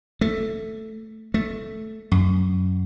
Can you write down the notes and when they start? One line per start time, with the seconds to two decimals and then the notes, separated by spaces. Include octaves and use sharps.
0.21 A3
1.34 A3
2.12 F#2